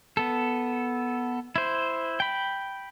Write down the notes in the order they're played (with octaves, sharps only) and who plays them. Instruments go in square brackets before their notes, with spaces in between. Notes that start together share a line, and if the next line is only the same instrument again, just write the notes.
[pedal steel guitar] B3 A4
E4 C5
G5 B5